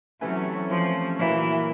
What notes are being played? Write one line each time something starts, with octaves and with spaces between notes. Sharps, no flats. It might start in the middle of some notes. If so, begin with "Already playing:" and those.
C3 E3 F#3 A3 C#4
F3
A#2 E3 F#3 A#3